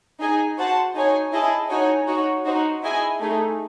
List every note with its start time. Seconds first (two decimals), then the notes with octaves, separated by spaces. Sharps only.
0.20 D#4 G#4 D#5 G#5
0.58 F#4 C5 F#5 A5
0.95 D#4 G#4 C#5 G#5
1.33 E4 G#4 D#5 A5
1.70 D#4 F#4 C#5 G#5
2.08 D#4 F#4 C#5
2.46 D#4 F#4 C5
2.83 E4 G#4 D#5 G#5
3.21 A3 D#4 G#4